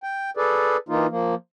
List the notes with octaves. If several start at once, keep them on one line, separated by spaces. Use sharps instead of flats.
G5
G#4 A4 B4 D5
E3 A#3 D#4 F4
F3 A#3